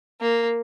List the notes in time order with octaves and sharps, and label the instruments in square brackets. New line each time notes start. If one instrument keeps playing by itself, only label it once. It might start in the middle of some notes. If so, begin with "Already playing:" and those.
[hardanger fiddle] A#3